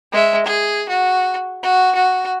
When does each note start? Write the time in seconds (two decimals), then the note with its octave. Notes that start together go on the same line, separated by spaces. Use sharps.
0.12 G#3 E5
0.46 G#4
0.89 F#4
1.63 F#4
1.95 F#4